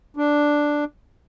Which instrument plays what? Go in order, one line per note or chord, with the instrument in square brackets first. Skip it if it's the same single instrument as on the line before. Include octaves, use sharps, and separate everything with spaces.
[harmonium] D4